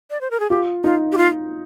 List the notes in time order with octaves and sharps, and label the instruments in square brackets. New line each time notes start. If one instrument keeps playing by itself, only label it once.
[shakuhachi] D5
C5
A#4
G#4
[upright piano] F4 [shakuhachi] G4
[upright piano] D#4 [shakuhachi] F4
[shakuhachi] G4
F4